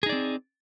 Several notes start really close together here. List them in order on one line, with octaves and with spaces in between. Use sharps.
G#4 D#4 D5 C4